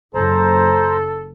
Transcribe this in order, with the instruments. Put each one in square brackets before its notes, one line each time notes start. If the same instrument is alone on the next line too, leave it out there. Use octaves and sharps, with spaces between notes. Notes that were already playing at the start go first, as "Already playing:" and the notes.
[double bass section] F#1 [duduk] A4 [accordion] C5 A#5